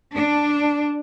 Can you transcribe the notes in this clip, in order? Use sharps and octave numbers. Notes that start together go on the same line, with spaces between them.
D4